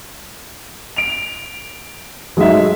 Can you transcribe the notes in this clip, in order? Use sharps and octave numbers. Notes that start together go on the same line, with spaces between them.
D7 F7
F#3 G#3 A3 D#4 E5